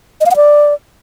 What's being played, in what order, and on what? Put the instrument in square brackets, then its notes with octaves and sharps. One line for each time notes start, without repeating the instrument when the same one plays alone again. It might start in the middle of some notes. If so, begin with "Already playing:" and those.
[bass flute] D#5
F5
F#5
D5